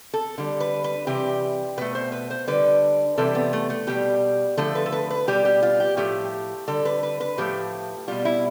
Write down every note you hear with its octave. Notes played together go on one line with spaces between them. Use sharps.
A4
D3 G3
B4
B4
C3 E3 G3 G4
B2 A3 B4
C5
B4
C5
D3 G3 B4
C3 E3 G3 A4
B3
A3
A3
B2 G3 G4
D3 F3 A3 A4
B4
A4
B4
B4
B2 G3 G4
G4
F4
G4
A2 F3 A3 G4
D3 G3 A4
B4
B4
B4
A2 F3 A3 G4
B2 G3 F4
E4